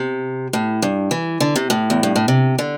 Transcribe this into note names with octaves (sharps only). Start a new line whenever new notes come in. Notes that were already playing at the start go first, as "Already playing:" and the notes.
Already playing: C3
A2
G2
E3
D3
C3
A2
E2
G2
A2
C3
D3